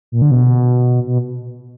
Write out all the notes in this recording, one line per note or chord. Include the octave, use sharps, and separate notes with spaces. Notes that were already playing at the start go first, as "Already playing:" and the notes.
A#2
D3
B2
B2